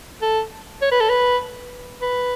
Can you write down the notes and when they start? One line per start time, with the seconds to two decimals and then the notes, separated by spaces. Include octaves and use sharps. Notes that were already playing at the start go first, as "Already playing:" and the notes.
0.22 A4
0.81 C#5
0.91 B4
1.00 A4
1.09 B4
2.01 B4